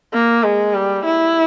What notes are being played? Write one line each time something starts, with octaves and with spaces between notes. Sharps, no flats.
A#3
G#3
G3
E4